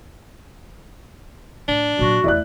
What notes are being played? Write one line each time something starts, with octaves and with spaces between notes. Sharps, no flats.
A2 D4
A#2 F#3 F#4
E2 A3 E4 D5 F#6